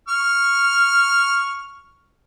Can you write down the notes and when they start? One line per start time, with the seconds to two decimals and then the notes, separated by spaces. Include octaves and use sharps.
0.08 C#6 F6